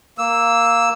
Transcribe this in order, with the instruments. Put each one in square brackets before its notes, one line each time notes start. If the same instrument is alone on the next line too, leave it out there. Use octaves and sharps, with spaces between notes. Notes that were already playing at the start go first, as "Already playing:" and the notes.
[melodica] A#3 E6